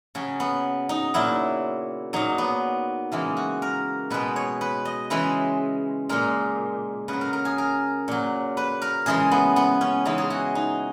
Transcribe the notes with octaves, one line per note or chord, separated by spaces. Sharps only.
C#3 F#3 C#4
B3
D#4
A#2 F#3 E4
A#2 F#3 D#4
B3
C#3 E3 G#3 A#3
F#4
A#4
B2 G#3 B4
C#5
B4
D#5
C#3 E3 G#3 B4
A#2 G#3 A#4
C#3 F#3 B4
A#4
A#4
G#4
A#4
A#2 F#3
B4
A#4
C#3 E3 G#3 G#4
B3
B3
C#4
C#3 E3 G#3 D#4
G#4
F#4
D#4